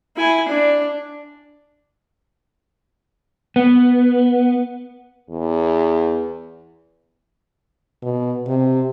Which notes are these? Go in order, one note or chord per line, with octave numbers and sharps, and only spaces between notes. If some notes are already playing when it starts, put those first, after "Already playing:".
E4 G#5
D4
B3
E2
B2
C3